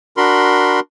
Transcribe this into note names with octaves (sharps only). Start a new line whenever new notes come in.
D4 F#4 A#4 B5 C6